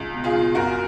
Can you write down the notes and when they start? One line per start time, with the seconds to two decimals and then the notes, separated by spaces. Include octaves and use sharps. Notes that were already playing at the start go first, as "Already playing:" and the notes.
Already playing: C#2
0.14 B2
0.24 F4 G#4
0.34 C#2
0.55 F#2 F#4 A#4